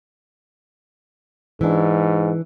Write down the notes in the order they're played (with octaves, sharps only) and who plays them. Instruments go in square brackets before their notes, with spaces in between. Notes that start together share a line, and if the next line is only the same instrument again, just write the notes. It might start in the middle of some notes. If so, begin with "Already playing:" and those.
[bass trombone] G#2 [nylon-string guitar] E3 D4